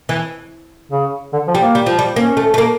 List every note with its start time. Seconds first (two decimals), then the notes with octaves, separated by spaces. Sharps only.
0.09 E3
0.92 C#3
1.33 D3
1.48 F3
1.55 G3
1.61 A#3
1.75 G3
1.86 F3
1.99 G3
2.16 A#3 C#4
2.37 A3
2.54 A3
2.58 A#3